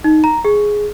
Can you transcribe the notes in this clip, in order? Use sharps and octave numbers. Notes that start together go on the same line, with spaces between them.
D#4
A#5
G#4